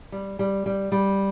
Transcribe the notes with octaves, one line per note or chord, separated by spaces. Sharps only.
G3
G3
G3
G3